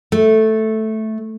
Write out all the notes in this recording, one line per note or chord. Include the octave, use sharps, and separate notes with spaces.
A3